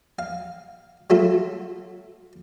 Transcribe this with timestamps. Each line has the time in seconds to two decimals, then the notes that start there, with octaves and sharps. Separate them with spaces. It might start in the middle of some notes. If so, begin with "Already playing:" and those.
0.19 F5
1.10 F#3 A3 F4 A4